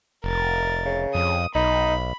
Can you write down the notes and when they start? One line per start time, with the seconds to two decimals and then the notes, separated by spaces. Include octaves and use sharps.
0.24 F1 A#4 A6
0.85 C#3
1.15 F2 D#6
1.55 B1 D#4 B5